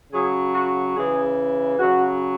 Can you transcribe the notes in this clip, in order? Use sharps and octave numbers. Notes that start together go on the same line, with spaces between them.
C#3 F#3 G#4
F#4
C#3 E3 G#4
C#3 F#3 F#4